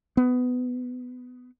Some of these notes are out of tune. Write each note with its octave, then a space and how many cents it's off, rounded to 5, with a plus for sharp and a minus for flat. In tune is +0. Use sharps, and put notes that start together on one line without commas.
B3 +20